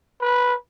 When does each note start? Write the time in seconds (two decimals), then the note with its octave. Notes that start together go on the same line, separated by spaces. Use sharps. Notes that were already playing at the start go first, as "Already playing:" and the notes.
0.21 B4